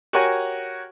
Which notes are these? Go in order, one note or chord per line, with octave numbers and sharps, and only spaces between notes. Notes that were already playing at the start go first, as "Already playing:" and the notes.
F#4 G4 A#4 C#5 F#5 G#5